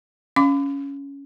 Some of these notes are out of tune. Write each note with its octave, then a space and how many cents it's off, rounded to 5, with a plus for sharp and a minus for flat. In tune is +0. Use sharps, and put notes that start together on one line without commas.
C#4 +10 F5 +0 D6 +0